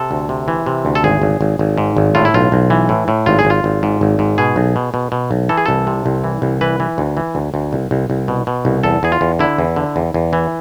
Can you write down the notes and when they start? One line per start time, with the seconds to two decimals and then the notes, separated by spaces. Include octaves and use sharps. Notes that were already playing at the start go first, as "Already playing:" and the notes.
Already playing: C3 A4
0.11 D2
0.29 C3
0.48 E3
0.66 C3
0.85 D2
0.95 A4
1.04 G#1 G#4
1.22 G#1
1.41 G#1
1.59 G#1
1.78 G#2
1.97 G#1
2.15 A2 F4
2.25 E4
2.34 B1 F4
2.52 B1
2.70 E3
2.89 A2
3.08 A2
3.26 G#1 F4
3.39 G#4
3.45 G#1
3.50 F4
3.64 G#1
3.83 G#2
4.01 G#1
4.19 G#2
4.38 B2 G#4
4.56 B1
4.76 B2
4.94 B2
5.12 B2
5.31 B1
5.49 E3 A4
5.58 G#4
5.66 C2 A4
5.87 C3
6.06 C2
6.24 E3
6.42 C2
6.61 E3 B4
6.80 E3
6.98 D2
7.17 E3
7.35 D2
7.54 D2
7.73 C2
7.91 C2
8.10 C2
8.28 B2
8.47 B2
8.65 C2
8.83 E2 A4
9.03 E2 G#4
9.12 F4
9.21 E2
9.39 D3 E4
9.58 E2
9.76 D3
9.96 E2
10.14 E2
10.33 E3